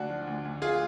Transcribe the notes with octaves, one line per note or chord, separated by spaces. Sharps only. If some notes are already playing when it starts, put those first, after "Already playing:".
Already playing: D2 D4 F#4
F3
D2
D2
F4 G#4